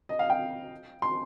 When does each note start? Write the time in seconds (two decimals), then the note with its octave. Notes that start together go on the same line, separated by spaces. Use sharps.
0.09 D#5
0.19 F5
0.30 G5
1.02 C6